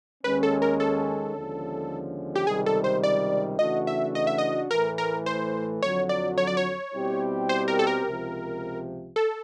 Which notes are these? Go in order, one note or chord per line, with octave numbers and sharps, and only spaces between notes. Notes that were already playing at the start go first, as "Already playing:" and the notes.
D#2 D#3 G#3 C#4 B4
A4
A#4
A4
D#2 D3 F3 G#3 C#4
G4
C#2 C3 D#3 G3 G#4
A4
C5
D5
C#3 E3 A3 D4 F#4 D#5
E5
D#5
E5
D#5
A2 E3 A3 A#4
A#4
C5
F2 D3 F#3 C#5
D5
C#5
D5
C#5
B2 G3 C4 E4 G4
C5
A#4
A4
A#4
C#2 C3 F3
A4